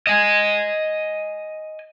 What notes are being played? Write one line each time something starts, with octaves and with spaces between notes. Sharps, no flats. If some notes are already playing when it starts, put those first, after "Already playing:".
D#5 G#5